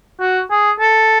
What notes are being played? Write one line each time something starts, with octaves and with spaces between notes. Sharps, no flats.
F#4
G#4
A4